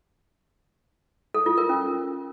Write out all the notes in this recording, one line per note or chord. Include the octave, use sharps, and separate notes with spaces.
A4
F4
A#4
C#4